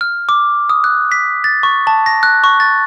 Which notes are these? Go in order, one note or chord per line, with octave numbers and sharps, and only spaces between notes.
F6
D6
D#6
F#6
B6
A6
C#6
A5
A#6
F#6
C#6
A6